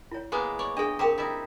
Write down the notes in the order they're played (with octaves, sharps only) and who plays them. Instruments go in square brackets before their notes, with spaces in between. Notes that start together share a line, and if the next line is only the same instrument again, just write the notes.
[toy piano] E4 C#5
[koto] G#3 A#3 B3
C#5 D5
[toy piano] D4 G#4 [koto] D#5 G5
[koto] C4 G4 [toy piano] A#4 G5 A#5
[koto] D#4 E4 [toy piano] D#5